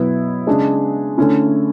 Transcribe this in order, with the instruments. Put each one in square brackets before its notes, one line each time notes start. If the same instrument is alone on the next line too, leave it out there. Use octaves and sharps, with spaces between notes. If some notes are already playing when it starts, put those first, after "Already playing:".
Already playing: [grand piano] B2 F#3 B3 E4
C#3 G#3 D4
D3 A3 C#4 E4